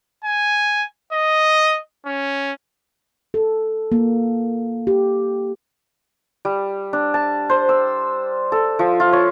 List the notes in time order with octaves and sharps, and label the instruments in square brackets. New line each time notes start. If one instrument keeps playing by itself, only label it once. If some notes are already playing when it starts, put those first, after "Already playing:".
[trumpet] G#5
D#5
C#4
[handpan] A4
A#3
G4
[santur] G3
D4
A5
C5
E6
A4
F3
F4
C#5